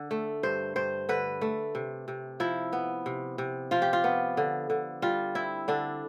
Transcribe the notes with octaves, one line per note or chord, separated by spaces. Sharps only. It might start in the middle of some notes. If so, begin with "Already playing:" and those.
Already playing: D3
A3
G2 C5
G2 C5
D3 B4
A3
C3
C3
F3 E4
B3
C3
C3
F3 F4
G4
F4
B3
D3
D3
G3 F4
C4 E4
D3 D4